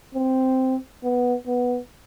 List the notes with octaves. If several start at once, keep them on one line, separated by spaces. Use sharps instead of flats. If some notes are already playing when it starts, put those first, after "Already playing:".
C4
B3
B3